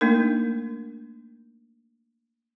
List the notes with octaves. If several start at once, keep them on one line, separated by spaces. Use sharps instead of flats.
A3 A#3 D4 D#4 A#4